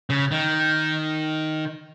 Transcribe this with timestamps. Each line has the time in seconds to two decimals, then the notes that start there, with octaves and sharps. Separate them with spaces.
0.10 C#3
0.31 D#3